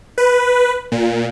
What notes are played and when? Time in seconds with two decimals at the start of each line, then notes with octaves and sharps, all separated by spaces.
0.18 B4
0.92 A#2